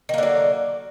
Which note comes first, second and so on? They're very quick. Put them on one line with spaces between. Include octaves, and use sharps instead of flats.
D#3 A#3 D3 F#3